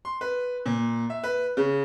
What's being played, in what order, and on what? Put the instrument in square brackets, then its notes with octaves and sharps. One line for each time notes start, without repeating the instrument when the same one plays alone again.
[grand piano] C6
B4
A#2
E5
B4
C#3